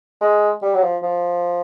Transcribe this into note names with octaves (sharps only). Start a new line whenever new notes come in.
G#3
G3
F#3
F3
F3